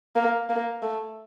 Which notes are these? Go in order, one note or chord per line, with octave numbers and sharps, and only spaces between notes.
A#3
A#3
A3